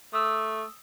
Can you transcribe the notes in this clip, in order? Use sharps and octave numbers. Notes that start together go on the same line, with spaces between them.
A3 D#6 E6